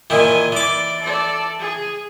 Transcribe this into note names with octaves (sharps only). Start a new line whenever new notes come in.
A#2 D#3 E3 G#5
E3 D5 D6
A4 D5
G#4